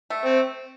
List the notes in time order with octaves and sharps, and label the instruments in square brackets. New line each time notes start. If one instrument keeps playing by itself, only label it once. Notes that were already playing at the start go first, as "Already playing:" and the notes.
[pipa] A3
[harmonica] C4